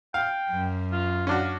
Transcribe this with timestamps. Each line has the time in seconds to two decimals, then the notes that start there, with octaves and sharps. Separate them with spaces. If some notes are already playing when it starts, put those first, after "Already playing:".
0.14 F5 G5
0.50 F#2
0.92 F4
1.27 C#4 D4 F#4 F5